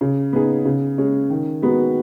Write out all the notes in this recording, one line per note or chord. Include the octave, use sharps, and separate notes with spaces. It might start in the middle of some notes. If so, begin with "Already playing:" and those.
C#3
B3 D#4 G#4
C#3
G#3 C#4
D#3
G#3 B3 D#4 F#4